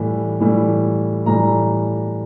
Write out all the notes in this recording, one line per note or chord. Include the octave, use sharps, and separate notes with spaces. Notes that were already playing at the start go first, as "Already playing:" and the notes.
Already playing: A2 E3 G3
A2 E3 G3
A2 E3 G3 A#5